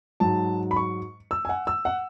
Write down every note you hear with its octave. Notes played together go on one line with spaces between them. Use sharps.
G#2 F#3 A5
B5
C#6
E6
G#5
F#5
E6
F#5